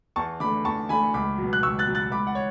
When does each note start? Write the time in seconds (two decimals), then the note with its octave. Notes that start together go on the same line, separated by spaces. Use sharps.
0.16 E2 A5 C#6
0.40 D3 A3 B5 D6
0.65 E2 A5 C#6
0.89 D3 G#5 B5
0.93 A3
1.14 C#2 B5 D6
1.38 B2 F#3
1.53 F#6
1.63 C#2 C#6 E6
1.79 F#6 A6
1.87 B2 F#3
1.95 F#6 A6
2.12 C#2 B5 D6
2.27 F#5
2.35 C#5